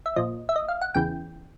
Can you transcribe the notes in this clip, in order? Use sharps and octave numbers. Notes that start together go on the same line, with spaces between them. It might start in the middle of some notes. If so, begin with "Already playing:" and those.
E5
A#2 F3 D#5
E5
D#5
F5
F#5
E2 C#3 E3 G5